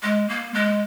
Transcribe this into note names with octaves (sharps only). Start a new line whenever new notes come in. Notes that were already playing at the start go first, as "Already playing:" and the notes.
G#3
A#3
G#3